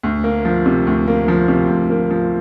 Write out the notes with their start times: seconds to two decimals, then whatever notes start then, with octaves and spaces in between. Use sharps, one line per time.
0.03 D2
0.24 A#3
0.45 F3
0.66 C3
0.87 D2
1.08 A#3
1.28 F3
1.48 C3
1.70 D2
1.90 A#3
2.11 F3